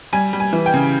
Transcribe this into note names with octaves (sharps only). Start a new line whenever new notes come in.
G3 G#5
G3
G#5
E3
G5
C#3